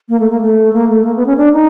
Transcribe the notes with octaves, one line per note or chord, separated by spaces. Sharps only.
A#3
A3
A#3
A3
A#3
A3
A#3
B3
C#4
D4
D#4